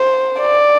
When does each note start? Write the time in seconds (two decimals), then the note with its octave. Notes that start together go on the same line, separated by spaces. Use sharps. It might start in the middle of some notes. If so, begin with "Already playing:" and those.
Already playing: C5
0.40 D5